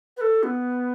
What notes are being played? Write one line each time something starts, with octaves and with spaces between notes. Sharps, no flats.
B4
A4
B3